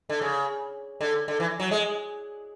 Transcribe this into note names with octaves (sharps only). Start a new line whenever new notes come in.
D3
C#3
D3
D3
E3
F#3
G#3